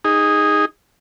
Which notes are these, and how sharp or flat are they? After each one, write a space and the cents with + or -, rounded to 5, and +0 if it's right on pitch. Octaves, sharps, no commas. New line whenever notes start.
D#4 +0 G#4 -20